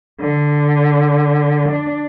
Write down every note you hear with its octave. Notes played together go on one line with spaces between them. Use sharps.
D3
D4